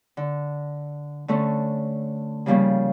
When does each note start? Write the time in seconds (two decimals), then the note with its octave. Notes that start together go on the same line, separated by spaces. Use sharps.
0.17 D3
1.28 D3 A3 C#4
2.46 C#3 F3 G3 A#3 C#4